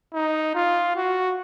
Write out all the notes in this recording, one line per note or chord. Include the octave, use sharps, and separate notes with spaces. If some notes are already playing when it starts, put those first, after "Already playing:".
D#4
F4
F#4